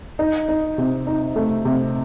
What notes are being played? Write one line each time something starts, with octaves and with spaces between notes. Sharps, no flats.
D#4
D#4
C3
D#4
A3
C3